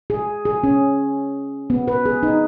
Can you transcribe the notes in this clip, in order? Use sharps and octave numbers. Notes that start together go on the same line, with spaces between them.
G#4
G#4
C#4
B3
B4
G#4
D#4